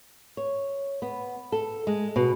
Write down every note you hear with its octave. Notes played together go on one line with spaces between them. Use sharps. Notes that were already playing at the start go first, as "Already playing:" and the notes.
C#5
B3
A4
G#3
B2